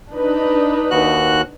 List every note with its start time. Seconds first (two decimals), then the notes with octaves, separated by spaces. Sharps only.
0.11 D4 D#4 B4
0.91 D#2 F#4 F#6